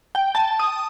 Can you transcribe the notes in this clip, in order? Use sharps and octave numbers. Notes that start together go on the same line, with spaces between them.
G5
A5
D#6